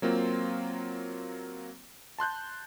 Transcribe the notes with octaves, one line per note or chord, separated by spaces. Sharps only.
F#3 A#3 C4 F4
A5 C6 F#6 G6